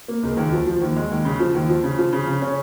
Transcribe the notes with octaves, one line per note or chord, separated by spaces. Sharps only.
A#3
C#2
D#2
F3
F3
D#2
G#3
D#2
C#3
F3
D#2
F3
C#3
F3
C#3
C#3
C#4